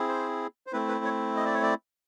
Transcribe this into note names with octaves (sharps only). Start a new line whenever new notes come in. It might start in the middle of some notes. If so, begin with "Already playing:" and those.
Already playing: C4 E4 G#4
C5
C5
A3 C4 E4 B4
B4
C#5
D#5
D5
C#5
D5